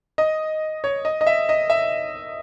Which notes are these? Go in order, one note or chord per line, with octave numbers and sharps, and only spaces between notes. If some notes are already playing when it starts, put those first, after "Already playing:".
D#5
C#5
D#5
D#5
E5
D#5
E5